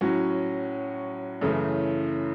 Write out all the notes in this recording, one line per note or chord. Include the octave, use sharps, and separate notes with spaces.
A2 F#3 C#4 F#4
F#2 C#3 E3 A3